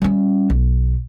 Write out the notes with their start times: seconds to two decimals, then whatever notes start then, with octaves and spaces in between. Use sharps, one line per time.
0.02 G3 C#4
0.50 B1